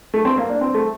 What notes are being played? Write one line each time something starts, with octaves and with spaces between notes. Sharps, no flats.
A3
C4
A#3
D4
C4
A3